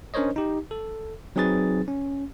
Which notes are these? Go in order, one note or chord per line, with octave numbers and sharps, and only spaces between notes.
C#4 D4 A#4 C5 C#5 D#5
D#4 G4
A4
F#3 C4 D#4 G#4 B4 A6
C#4